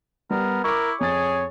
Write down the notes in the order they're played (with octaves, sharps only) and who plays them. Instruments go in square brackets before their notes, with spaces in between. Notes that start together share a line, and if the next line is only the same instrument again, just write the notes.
[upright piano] G3 [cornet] B3 [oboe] A#4
[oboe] E4 [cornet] A#4 [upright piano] C#6 D6
[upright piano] F2 A6 [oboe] G#4 [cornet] C#5